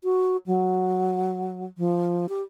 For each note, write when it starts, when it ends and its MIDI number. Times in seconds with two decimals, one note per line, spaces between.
0.04 0.37 66
0.46 1.65 54
1.78 2.26 53
2.29 2.42 67